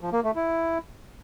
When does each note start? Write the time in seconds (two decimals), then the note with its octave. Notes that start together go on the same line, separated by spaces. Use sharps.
0.01 F3
0.12 A#3
0.24 A3
0.36 E4